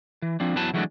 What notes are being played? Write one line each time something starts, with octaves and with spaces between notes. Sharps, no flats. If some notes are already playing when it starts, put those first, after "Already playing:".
E3
F3 C4 D4
E2 E3 F#3 B4 A5
E3 F#3 G#3 A3 D4